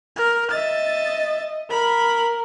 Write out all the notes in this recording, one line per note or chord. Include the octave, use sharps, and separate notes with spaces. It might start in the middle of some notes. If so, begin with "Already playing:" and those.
A#4
D#5 E5 A6
A#4 B5